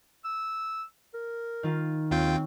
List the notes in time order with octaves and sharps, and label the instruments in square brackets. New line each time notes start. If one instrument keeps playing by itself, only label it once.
[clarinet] E6
A#4
[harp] D#3 F4
[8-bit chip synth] D#2 F4 G5 [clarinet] C4 [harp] C#4